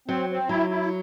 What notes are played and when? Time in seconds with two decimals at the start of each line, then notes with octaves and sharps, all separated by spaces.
0.08 F#3 C4
0.29 C4
0.49 F#3 E4
0.70 E4